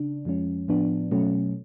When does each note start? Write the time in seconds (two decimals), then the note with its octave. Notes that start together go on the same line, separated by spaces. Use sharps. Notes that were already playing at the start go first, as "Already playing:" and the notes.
Already playing: C#3 D4
0.25 F2 F3 G#3 C#4
0.68 A2 F3 B3 D4
1.11 B2 F#3 A3 C#4